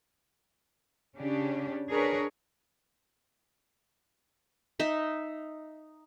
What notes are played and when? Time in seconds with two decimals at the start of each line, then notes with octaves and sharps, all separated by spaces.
1.16 C#3 C#4 D4 G4
1.89 D4 G#4 A#4 B4 C#5
4.80 D#4 E5